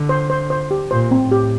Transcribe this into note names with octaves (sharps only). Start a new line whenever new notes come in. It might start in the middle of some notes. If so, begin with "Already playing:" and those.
Already playing: D3
C5
C5
C5
G4
A#2 C5
C4
A2
G4